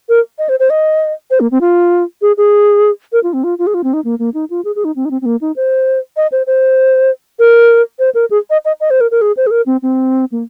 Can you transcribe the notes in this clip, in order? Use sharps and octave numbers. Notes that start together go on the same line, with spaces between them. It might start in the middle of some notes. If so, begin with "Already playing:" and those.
A#4
D#5
C5
C5
D#5
C5
A#3
C4
F4
G#4
G#4
A#4
F4
C4
F4
F4
G#4
F4
C4
D#4
A#3
A#3
D#4
F4
G#4
G#4
D#4
C4
D#4
C4
C4
A#3
D#4
C5
D#5
C5
C5
A#4
C5
A#4
G#4
D#5
D#5
D#5
C5
A#4
A#4
G#4
C5
G#4
A#4
C4
C4
A#3